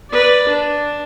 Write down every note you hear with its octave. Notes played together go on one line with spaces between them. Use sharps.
B4 D5
D4